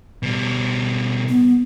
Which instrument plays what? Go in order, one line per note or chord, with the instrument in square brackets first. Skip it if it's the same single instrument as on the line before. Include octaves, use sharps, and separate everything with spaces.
[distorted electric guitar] B2 G3
[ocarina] B3